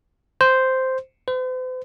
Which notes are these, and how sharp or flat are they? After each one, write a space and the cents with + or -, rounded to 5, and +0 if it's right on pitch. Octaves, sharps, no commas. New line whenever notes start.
C5 -5
C5 -45